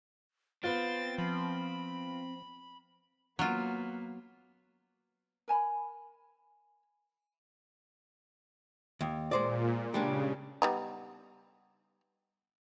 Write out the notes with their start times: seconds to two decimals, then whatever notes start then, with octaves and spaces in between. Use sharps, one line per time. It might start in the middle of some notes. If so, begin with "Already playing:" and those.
0.64 B3 C4 F4 A6
1.18 F3 B5
3.39 F#3 A#3 B3 F4
5.48 A#4 G#5 A5 B5
9.01 D#2
9.31 A#2 G#3 C5 D5
9.94 C#3 G3 G#3 D4
10.62 G3 B3 D#4